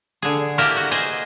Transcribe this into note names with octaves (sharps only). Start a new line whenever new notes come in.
D3 G#4
A#3 E4 G4 A#4 D5
F#4
G#4 C5 D#5